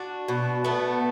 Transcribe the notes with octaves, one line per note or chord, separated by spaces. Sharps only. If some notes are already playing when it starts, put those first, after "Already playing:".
Already playing: D4 F#4
B2
A3 B3